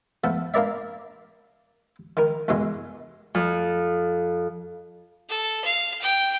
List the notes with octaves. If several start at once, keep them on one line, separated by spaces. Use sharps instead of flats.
F3 A3 B3 A4
A#3 D4 A#4 D5 E5
D#3 A#4
E2 G2 B2 D3 G#3
F2
A4
F5
G5